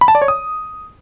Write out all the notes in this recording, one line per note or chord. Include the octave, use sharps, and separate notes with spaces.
B5
A5
D5
C#5
D#6